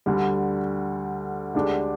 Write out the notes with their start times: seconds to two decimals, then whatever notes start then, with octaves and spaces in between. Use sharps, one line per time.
0.06 D2 D3 G3
1.55 D2 D3 G#3 D4 G4